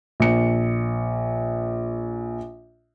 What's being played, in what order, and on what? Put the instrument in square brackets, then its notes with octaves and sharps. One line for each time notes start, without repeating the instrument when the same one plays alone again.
[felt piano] A#1 C#7